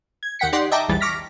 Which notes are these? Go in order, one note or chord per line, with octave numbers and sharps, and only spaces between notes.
G#6
D#2 F#5 G5 B6 C#7
D#4 G4 D5 F#5 C6
D#5 E5 G5 A5 A#5 D6
A#1 E2 E3 G3 A6
C#6 D6 F6 A#6 B6